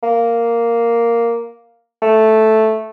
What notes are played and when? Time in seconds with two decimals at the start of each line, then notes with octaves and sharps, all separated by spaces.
0.03 A#3
2.02 A3